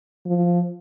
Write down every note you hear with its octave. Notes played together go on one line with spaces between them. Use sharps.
F3